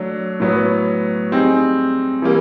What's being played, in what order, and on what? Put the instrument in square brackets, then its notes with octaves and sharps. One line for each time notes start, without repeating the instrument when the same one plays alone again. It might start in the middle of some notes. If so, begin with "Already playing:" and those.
Already playing: [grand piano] F#3 A3 D4
A2 F#3 B3
G3 C4 D#4 G#4
E3 G3 A#3